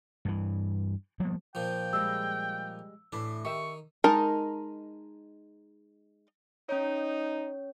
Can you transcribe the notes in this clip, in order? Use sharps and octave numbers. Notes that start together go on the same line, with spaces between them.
G2 E3
F3 G3 A#3 B3
A#2 F3 G5
G3 G#3 E6
A2 E3 D4
D#3 G4 E5 C#6
G#3 D#4 A#4 A5
C#4 D#4 C#5